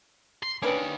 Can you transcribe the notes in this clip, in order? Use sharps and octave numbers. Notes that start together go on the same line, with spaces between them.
C6
A#3 C#4 D4 B4 G5